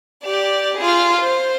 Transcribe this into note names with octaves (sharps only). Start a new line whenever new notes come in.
G4 D5
F4 G#4
C5